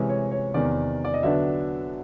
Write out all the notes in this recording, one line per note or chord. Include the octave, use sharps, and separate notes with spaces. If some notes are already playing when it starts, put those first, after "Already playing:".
Already playing: C3 E3 G#3 C#4
C#5
C#5
E2 C3 D#3 D5
D5
D#5
D3 F#3 B3 D4 E5